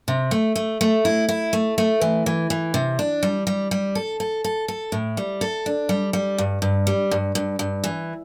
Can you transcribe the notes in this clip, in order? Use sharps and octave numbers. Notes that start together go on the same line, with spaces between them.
C3
A3
A3
A3
E4
E4
A3
A3
E3
E3
E3
C3
D4
G3
G3
G3
A4
A4
A4
A4
A2
G3
A4
D4
G3
G3
G2
G2
G3
G2
G2
G2
E3